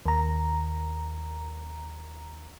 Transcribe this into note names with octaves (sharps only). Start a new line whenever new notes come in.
D#2 A#5